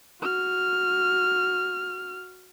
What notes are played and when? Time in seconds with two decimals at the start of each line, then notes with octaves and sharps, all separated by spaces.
0.21 F#4 F6